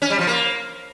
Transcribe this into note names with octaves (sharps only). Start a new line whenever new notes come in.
C#4
G3
F3
A#3